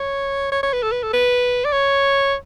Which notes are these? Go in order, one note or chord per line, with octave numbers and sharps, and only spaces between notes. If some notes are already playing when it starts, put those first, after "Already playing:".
Already playing: C#5
C#5
C#5
B4
A4
B4
A4
B4
D5
C#5